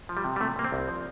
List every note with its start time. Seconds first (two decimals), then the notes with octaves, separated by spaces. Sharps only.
0.09 F3
0.17 G3
0.25 C3
0.36 G3
0.40 C3 A3
0.56 C3 A#3
0.64 C4
0.72 C2
0.88 F3